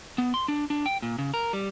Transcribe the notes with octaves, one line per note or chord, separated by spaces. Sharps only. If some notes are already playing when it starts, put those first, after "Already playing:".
B3
C6
D4
D4
G5
A#2
C#3
A#4
G3